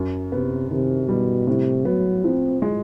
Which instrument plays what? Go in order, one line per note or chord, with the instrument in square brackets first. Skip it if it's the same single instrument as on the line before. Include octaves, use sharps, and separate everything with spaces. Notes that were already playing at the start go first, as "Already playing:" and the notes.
Already playing: [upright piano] F#2
[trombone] C3 [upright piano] B3
[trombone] C3 [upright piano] D#3
[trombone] B2 [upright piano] G3
[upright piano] A2 [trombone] C3
[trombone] F#3 [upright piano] B3
[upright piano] F3 [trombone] C4
[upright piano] G#3